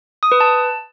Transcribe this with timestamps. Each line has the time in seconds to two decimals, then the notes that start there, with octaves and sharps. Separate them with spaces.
0.23 D#6
0.32 B4
0.40 A5